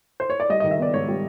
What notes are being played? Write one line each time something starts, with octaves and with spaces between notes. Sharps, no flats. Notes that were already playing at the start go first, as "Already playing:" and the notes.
C5
C#5
D5
G3 D#5
D#3 D#5
E5
B3 D5
G#2 C#5
G3